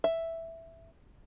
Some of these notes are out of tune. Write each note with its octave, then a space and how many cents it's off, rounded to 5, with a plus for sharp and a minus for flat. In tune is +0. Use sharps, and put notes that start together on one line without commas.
E5 +0